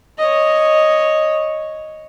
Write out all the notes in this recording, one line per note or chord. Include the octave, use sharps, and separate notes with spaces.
C#5 D#5